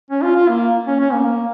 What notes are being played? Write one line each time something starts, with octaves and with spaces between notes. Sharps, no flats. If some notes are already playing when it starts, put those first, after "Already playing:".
C#4
F4
F4
A#3
C#4
C#4
A#3
A#3